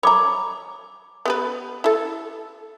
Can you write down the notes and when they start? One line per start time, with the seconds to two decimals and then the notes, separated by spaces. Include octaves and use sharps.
0.03 C#5 A#5 B5 D6
1.26 B3 G4 B4
1.84 E4 A4